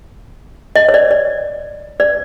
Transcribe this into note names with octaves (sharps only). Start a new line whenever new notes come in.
D#5
C#5
D5
D5
D5